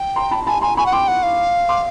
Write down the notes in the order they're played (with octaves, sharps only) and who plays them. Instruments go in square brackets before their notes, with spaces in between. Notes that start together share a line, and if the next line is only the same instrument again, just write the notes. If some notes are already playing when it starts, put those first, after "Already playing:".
Already playing: [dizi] G5
[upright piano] A#5 C6
A5 B5
[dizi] G#5 [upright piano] A5 B5
[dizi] G#5 [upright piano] A#5 C6
[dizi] G#5 [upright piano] B5 C#6
[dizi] F#5
[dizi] G5 [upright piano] C6 D6
[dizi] F#5
F5
[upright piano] C6 D6